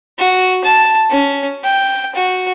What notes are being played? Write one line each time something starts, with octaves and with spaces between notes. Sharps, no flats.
F#4
A5
C#4
G5
F#4